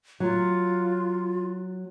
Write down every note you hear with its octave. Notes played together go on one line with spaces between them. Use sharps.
F#3 F4